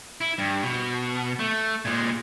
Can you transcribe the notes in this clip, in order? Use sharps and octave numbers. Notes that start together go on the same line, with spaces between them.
E4
G2
B2
A3
A#2 G#3